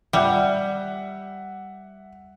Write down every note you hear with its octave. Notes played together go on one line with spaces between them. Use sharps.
G3 E5 F#5